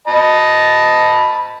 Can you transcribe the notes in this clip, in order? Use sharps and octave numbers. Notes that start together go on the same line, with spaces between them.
D#5 A5 B5